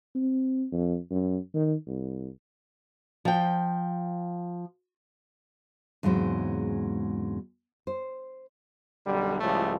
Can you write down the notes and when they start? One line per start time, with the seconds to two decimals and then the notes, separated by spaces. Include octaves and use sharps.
0.15 C4
0.72 F2
1.11 F#2
1.54 D#3
1.87 C2
3.25 F3 G5
6.03 E2 G#2 C#3 F#3 G#3 C4
7.87 C5
9.06 B1 F#2 D3 G3
9.40 C#2 A2 F3 G3 A3